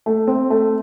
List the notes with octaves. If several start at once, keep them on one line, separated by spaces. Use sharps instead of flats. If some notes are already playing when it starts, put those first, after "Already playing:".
A3
C4
A3